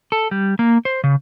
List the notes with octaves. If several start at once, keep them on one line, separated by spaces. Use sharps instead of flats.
A4
G3
A#3
C5
C#3